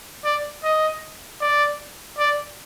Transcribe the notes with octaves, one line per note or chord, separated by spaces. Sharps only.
D5
D#5
D5
D5